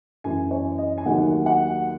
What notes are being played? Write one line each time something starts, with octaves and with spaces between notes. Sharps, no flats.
F#2 E3 A3 G#5
C#5
D#5
G#5
D#2 D#3 F#3 A3 F#5
F#5